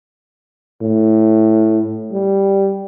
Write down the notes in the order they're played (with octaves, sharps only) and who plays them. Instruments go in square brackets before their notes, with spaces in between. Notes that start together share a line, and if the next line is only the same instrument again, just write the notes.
[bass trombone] A2
G3